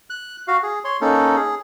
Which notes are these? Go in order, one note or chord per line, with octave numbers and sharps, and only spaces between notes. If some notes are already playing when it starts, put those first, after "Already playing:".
F#6
F#4 F5
G#4
C#5 C6
A#3 C#4 D#4 A4
G#4